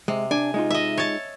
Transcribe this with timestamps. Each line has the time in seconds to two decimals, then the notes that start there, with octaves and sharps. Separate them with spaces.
0.08 C3 G#3
0.31 D4 G#5
0.54 G#3 D#4 F4
0.70 D#5 E5
0.98 C#5 A5